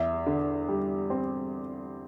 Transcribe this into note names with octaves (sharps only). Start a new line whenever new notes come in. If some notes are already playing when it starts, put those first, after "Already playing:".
Already playing: E2 E5
D3
G3
C4